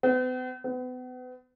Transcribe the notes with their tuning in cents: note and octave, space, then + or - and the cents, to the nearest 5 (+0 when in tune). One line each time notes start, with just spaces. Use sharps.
B3 +45
B3 +35